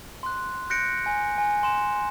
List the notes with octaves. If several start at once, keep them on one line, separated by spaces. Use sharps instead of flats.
C6 F#6
F#6 G6 A#6 C#7 D7
G#5
G#5
C6 E7